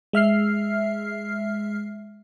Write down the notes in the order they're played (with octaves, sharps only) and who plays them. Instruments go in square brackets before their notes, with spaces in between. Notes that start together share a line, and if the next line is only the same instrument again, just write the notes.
[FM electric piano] G#3 E5 F6 C7